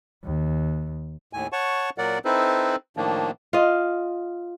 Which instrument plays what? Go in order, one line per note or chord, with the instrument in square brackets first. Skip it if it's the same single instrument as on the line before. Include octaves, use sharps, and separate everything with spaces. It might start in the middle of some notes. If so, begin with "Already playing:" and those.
[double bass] D#2
[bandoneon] D#2 A2 G#5
C#5 F#5 A5 C#6
A#2 F#3 A#4 D5 F#5
C4 D#4 E4 A4 B4 C5
A2 D#3 F3 A#3 D4
[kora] F4 D#5